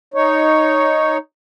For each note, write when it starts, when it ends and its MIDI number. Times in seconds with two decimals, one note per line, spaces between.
0.14 1.17 63
0.14 1.17 73